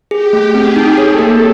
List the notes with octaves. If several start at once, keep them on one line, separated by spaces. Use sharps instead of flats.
G4 G#4
A3
C4 G#4
D#4
A4 C#5
A#3